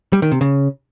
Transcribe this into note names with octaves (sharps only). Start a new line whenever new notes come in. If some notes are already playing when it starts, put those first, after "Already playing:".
G3
D#3
C3
C#3